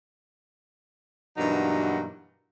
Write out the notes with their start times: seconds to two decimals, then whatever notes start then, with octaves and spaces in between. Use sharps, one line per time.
1.37 G2 B2 E3 F#3 A#3 D#4